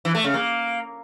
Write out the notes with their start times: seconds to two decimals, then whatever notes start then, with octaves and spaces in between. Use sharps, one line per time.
0.05 E3
0.15 A3
0.24 C#3
0.34 A#3